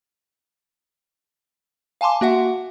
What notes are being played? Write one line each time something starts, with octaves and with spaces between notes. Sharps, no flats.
F5 G#5 A5 C6 D6
A#3 F#4 E5 F#5